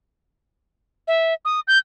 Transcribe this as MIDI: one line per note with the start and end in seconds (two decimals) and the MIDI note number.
1.08 1.34 76
1.45 1.60 87
1.68 1.78 91